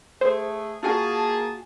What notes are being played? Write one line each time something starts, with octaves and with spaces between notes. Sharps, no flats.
A3 G#4 C5
A#3 F4 F#4 G#4 G#5 A5